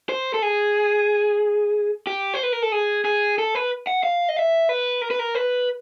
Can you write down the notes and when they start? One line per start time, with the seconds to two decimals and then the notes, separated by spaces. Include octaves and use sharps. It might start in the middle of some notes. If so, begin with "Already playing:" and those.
0.09 C5
0.34 A4
0.42 G#4
2.07 G4
2.34 C5
2.43 B4
2.53 A#4
2.62 A4
2.72 G#4
3.05 G#4
3.38 A4
3.55 B4
3.87 F#5
4.03 F5
4.29 D#5
4.36 E5
4.69 B4
5.02 A#4
5.11 B4
5.19 A#4
5.35 B4